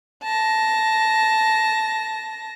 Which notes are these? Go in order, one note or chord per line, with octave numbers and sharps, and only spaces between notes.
A5 A#6